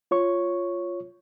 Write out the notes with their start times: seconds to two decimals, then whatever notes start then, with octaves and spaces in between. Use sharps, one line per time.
0.11 F4 C#5 C#6